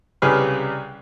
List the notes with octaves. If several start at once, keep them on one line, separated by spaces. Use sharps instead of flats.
C2 C#3 G4 G#4 B4 F6